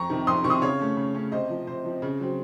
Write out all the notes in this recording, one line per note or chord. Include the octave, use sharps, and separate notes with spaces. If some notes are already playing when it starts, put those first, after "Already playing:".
Already playing: F2 A#5 C#6
C3 D#3
F2 C6 D#6
C3 D#3 C#6
C6 D#6
C#3 C#5 F5
A3 C#4
C#3
A3 C#4
C3 C5 D#5
F3 C4
C3 C5
F3 C4
C#3
F#3 C4